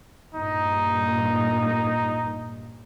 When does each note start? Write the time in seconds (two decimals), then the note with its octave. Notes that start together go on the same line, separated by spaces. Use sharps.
0.34 G2 A#2 D#4